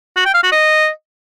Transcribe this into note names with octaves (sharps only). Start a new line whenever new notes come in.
F#4
G5
F5
F#4
D#5